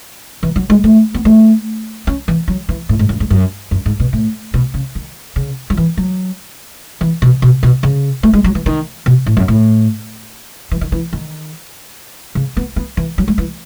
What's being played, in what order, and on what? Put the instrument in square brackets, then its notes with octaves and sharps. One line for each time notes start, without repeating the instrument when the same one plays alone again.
[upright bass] E3
F#3
G#3
A3
B3
A3
C#4
E3
F#3
E3
A2
G#2
F#2
G#2
F#2
F#2
G#2
B2
A2
B2
C#3
D#3
C#3
F#3
E3
F#3
E3
B2
B2
B2
C#3
A3
G#3
F#3
E3
D#3
B2
A2
F#2
A2
E3
D#3
E3
D#3
C#3
B3
B3
E3
F#3
G#3
E3